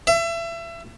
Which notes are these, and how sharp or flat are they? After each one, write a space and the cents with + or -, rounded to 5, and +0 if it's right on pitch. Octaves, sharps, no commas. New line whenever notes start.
E5 +30